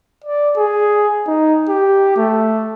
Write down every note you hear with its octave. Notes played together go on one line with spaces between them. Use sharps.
D5
G#4
D#4
G4
A3